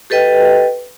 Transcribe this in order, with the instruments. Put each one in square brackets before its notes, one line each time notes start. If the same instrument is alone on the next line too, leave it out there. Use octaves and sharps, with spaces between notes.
[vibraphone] G4 A4 B4 D#5 G5